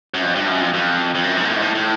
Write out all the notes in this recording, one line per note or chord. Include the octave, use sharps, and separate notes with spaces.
F#2
F2
G2
F#2
F2
F2
F2
F#2
G#2
A#2
A2
G#2
A2
A2